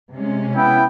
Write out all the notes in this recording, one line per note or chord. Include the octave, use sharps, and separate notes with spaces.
C3 G#3 C#4
B3 E4 G5